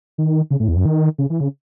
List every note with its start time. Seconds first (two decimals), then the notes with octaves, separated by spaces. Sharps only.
0.18 D#3
0.51 C#3
0.60 A2
0.68 E2
0.76 F#2
0.85 D#3
1.18 C#3
1.30 E3
1.40 C#3